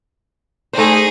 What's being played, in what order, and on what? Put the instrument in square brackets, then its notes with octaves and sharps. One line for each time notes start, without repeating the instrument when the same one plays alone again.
[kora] A3 C5 [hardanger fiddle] D#4 G#4